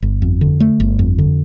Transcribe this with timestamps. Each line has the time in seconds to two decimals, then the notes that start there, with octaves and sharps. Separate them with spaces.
0.02 G1
0.22 F2
0.41 D3
0.60 A3
0.80 G1
0.99 F2
1.19 D3